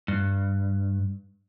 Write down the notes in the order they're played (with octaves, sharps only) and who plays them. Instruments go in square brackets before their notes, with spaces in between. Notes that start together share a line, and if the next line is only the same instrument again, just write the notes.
[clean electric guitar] G2